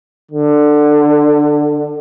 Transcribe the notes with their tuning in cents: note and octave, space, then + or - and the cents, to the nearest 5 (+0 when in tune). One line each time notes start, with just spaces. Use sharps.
D3 +15